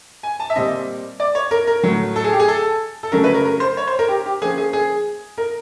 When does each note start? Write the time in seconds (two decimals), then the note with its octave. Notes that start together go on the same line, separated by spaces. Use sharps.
0.23 G#5
0.40 A5
0.50 E5
0.55 A#2 G3 C4 D#5
1.20 D5
1.35 C#5
1.51 A#4
1.67 A#4
1.83 A2 F#3 A3
2.16 A4
2.24 G#4
2.33 G4
2.39 G#4
2.48 A4
3.03 A4
3.12 C#3 F#3 A3 C#4 A#4
3.24 B4
3.34 A#4
3.45 A#4
3.60 C5
3.77 C#5
3.88 C5
3.99 A#4
4.08 G4
4.26 G4
4.41 F3 A#3 C#4 G#4
4.58 G#4
4.73 G#4
5.38 A#4